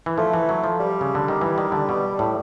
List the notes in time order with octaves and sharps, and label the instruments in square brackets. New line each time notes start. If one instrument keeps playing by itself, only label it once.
[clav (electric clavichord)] E3
[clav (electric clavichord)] F3 [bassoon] A3
[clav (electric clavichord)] E3
F#3
F3
[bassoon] G3
[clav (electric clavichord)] C#3
D3
D#3
E3
D#3
D3
B2
A2